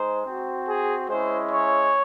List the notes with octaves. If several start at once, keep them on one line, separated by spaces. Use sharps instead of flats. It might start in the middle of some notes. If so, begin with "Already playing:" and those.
Already playing: G#3 D#4 C5
C4 F#4
G#4
G#3 C#4 E4 C5
C#5